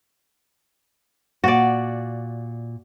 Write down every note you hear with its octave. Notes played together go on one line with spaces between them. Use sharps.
A#2 F#4 D5